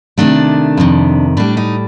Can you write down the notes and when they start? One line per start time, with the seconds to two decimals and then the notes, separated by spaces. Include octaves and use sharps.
0.17 C3 D#3 A3 D4
0.77 F2 C3 D#3
1.37 A2 G3 D4
1.57 D#4